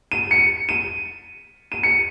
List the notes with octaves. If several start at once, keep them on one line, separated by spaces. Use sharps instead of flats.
D#7
C#7
D#7
D#7
C#7